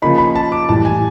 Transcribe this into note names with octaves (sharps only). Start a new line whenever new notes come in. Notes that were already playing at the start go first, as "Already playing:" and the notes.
C#3 F3 A#3 D#4 B5
B5
A5
D6
A2 E3 G3 A5
G#5